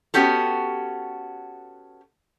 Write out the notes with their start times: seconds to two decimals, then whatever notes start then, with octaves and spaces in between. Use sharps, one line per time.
0.14 B3 C#4 F#4 G4 A4